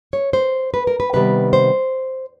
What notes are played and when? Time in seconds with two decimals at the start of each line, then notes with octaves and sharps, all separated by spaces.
0.13 C#5
0.33 C5
0.74 B4
0.87 A#4
1.00 B4
1.13 C3 D#3 G3 B3 B4
1.53 C5